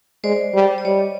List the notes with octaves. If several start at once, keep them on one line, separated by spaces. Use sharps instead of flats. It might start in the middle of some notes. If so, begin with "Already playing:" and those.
G#3 C5 D5
G3
D5
G3 C#5 D#5